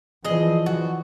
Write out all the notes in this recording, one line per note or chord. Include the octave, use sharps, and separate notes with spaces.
E3 F3 G#4 D#5
F#4